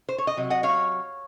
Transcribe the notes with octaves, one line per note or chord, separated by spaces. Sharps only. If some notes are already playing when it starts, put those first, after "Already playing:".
C5
C#5
D#5
C3 F#3
D#5 F#5
C#5 F5